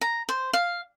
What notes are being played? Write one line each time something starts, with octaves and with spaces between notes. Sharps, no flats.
A#5
C5
F5